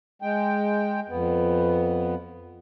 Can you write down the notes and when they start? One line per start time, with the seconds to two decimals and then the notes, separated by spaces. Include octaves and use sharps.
0.22 G#3 G5
1.09 F2 B3